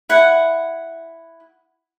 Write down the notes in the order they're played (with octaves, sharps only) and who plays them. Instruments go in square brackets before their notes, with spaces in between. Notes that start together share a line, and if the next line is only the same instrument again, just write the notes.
[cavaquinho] E4 F#5